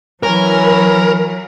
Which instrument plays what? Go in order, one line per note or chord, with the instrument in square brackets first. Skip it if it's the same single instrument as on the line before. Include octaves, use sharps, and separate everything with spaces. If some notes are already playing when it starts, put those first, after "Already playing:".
[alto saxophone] E3 [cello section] F#3 [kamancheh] C#4 B5 [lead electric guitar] A#4